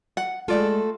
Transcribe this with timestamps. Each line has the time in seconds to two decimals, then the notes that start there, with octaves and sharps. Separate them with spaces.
0.17 F#5
0.48 G#3 A3 F4 F#4 A4 D5